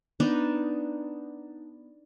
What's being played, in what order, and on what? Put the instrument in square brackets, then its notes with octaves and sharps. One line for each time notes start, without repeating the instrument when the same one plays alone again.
[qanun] B3 D4 D#4 D5